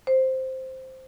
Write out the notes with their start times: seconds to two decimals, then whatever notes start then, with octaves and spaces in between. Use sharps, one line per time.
0.07 C5